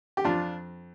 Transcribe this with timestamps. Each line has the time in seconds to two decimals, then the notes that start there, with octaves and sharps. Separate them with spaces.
0.17 G4
0.24 F2 D4 F4